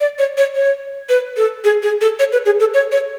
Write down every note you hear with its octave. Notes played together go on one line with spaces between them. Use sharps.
D5
C#5
C#5
C#5
B4
A4
G#4
G#4
A4
C#5
B4
G#4
A4
C#5
C#5